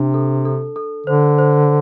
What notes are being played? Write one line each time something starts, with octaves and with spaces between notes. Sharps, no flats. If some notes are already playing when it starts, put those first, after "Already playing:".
Already playing: C3 D4
A4
A4
A4
D3 C5
C5